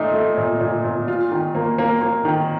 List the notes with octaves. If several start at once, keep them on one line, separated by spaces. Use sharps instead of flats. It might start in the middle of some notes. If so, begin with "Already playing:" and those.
Already playing: A#2 A3 D#4
A3
A#2
A#2
A#2
F4
D#3
A#3
A#3
A#3
D#3